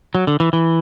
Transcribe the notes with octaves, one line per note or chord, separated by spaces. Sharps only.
F#3
D3
E3
E3